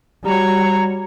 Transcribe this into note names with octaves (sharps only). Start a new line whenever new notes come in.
G3 F#4 C#5 A#5